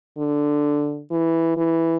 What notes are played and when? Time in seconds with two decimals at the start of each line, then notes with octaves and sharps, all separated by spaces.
0.18 D3
1.11 E3
1.57 E3